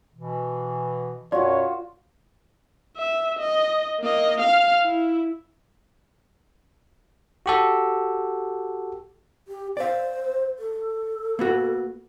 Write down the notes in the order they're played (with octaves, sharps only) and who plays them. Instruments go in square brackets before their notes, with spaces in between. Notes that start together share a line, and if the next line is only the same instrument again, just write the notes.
[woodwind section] B2 E3
[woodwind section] F#2 B2 [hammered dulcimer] F4 F#4 [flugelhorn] C#5 [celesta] D5
[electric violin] E5
D#5
A#3 D#5
F5 F6
E4
[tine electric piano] F#4 G4 A4
[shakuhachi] G4
[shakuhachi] C5 [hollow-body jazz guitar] D5 F5
[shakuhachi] A4
[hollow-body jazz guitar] A#3 B3 F#4